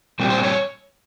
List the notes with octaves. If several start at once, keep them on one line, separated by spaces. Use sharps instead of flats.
A#2 G3 C4
C5
C#5